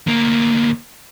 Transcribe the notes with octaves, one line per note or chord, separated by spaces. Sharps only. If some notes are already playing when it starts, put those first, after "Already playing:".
D2 A#3